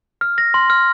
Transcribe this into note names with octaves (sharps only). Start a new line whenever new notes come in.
F6
A#6
C6
F6